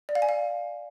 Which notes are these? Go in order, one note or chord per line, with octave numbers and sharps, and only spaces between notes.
D5
F5
G#5
F5